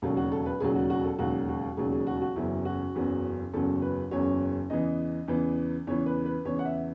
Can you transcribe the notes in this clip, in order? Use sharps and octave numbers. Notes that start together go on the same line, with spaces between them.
E1 D#2 C#3 F#3 A4
F#4
A4
B4
E1 D#2 C#3 F#3 G#4
F#4
F#4
A4
E1 D#2 C#3 F#3 F#4
F#4
E1 D#2 C#3 F#3 G#4
G#4
F#4
F#4
F#1 E2 C#3 F#3 E4
F#4
F#1 E2 C#3 F#3
F#1 E2 C#3 F#3 A4
B4
F#1 E2 C#3 F#3 C#5
E2 C#3 E3 D#5
E2 C#3 E3
E2 C#3 E3 C#5
B4
B4
E2 C#3 E3 C#5
F#5
E5